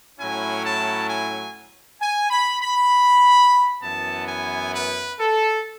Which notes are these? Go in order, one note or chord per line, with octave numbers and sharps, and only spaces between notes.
A2 F#3 C#4 E4 G#5
A5
G#5
G#5
B5
B5
F#2 E3 B3 E4 A5
G#5
B4
A4